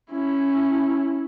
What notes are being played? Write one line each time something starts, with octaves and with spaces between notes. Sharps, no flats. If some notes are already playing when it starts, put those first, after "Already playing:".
C#4 E4